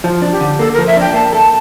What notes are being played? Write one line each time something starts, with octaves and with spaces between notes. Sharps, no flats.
F3 F4
D4
G4
D3
A#3 A4
F3 A#4
E5
D4 G5
A#3 A5
A4